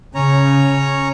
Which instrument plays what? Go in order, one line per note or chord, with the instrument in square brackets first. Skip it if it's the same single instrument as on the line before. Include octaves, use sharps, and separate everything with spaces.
[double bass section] C#3 [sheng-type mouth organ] C#4 C#5 A#5